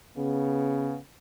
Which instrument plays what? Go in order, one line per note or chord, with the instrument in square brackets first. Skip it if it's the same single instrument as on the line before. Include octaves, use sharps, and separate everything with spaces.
[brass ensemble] C#3 B3